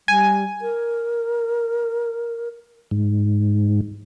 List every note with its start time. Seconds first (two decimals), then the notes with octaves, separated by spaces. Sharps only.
0.08 G3 G#5
0.62 A#4
2.91 G#2